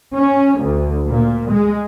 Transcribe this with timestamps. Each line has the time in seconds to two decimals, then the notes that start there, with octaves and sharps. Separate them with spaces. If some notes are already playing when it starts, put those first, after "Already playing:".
0.16 C#4
0.61 D2
1.07 A#2
1.51 G#3